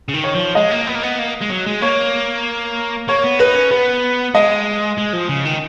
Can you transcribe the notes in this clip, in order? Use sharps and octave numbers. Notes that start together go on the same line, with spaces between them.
C#3
D#3
C#5
F3
G#3 D#5
A#3
B3
A#3
B3
A#3
G#3
F#3
G#3
A#3 C#5
A#3 C#5
B3
D#4 B4
C#4
B3 B4
G#3 D#5
G#3
F3
C#3
D#3